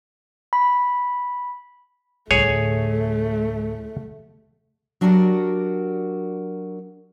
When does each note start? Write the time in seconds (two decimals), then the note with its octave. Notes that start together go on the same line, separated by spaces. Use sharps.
0.53 B5
2.31 D2 A2 A3 G#4 C#5
5.01 F#3 D4 F#4 G4 A#4 D5